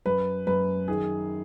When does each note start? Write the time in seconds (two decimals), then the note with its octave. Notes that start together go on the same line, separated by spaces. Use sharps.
0.06 F#2 B4
0.47 F#2 B4
0.88 D#3 G#4